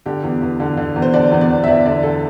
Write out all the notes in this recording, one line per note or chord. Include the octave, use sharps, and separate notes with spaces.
D3 G4
E2
E2
D3
D3
E2
C5
D3 D5
E2
D5
E2
E5
E2 D5
D3 D5
D3 A4